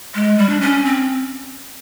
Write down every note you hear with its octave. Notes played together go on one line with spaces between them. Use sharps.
G#3
G3
D4
C#4
C4